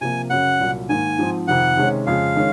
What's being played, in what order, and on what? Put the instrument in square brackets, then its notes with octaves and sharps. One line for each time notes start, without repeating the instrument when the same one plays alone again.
[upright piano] C3 F3 A#3 [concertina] G#5
[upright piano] F#2 C#3 F#3 C#4 [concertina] F#5
[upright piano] C2 A#2 F#3
[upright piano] G#2 D#3 A#3 [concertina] G#5
[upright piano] G#2 F3 C4
[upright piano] F2 C3 D#3 [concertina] F#5
[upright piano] C3 D#3 G#3 C#4
[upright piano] F2 C#3 G#3 [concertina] F5
[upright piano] D#3 G#3 C#4